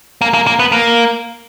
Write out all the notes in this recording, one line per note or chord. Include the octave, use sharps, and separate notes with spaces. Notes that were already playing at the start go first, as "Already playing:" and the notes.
A#3
A#3
A#3
B3
A#3